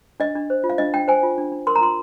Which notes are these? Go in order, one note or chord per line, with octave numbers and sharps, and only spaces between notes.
D4 D#5
D4
C5
F4
F5
D4 D#5
D4 G5
C5 G#5
F4
D4
D4
A#4 C6
A#5
F4 C6